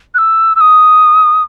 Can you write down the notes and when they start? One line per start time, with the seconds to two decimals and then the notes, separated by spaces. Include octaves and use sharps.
0.14 F#6
0.18 E6
0.56 E6
0.61 D#6